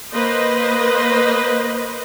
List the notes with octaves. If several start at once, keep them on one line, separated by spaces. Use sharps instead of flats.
A#3 B4 C5 D#5